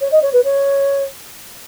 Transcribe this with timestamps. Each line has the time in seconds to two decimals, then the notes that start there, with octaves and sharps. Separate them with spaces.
0.01 C#5
0.11 D#5
0.22 C#5
0.33 B4
0.44 C#5